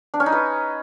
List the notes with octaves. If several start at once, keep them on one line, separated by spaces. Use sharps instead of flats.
D4
C#4
D#4
B4